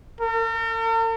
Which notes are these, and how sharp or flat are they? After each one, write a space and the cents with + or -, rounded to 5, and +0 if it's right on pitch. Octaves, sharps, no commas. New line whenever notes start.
A#4 -45